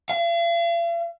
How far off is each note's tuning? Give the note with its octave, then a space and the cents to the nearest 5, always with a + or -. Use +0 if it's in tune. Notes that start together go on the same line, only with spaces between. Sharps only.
F5 -45